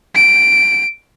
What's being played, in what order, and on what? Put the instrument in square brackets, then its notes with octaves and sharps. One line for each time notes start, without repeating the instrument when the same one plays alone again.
[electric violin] D7